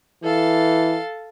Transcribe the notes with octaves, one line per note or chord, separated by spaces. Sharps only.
E3 A4 F5 A5